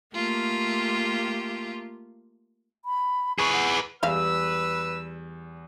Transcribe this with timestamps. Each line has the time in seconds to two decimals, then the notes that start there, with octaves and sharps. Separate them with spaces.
0.14 A3 A#3 F4 G4
2.85 B5
3.39 G#4 B4 C#6
3.53 F#5
4.03 E2 G3 G#3 B4 E5 F5 E6